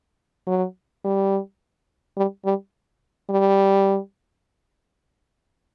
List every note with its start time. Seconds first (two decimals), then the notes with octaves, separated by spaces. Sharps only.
0.47 F#3
1.05 G3
2.17 G3
2.45 G3
3.30 G3